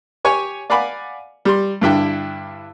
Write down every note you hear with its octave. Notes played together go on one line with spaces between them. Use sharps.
G4 C#5 G#5 C#6
D5 F5 F#5 G#5 B5 D6
G3 C6
G2 D3 E4 G5